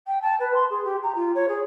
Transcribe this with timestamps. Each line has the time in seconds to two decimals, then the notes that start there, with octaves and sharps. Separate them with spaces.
0.07 G5
0.21 A5
0.40 B4
0.54 C6
0.70 G#4
0.84 G4
1.03 A#5
1.15 F4
1.35 C#5
1.48 G#4